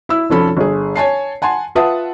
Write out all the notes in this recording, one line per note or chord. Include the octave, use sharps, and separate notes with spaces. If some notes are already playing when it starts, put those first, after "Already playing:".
E4 E6
F1 F3 C#4 A4 B5
G1 G#4
C#5 G#5 A5 C7
F#5 G#5 A5 C6
F4 B4 E5 F#5 A5 D#6